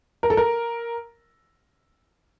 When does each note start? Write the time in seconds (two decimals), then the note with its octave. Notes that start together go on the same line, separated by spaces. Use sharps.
0.23 A#4
0.30 A4
0.37 A#4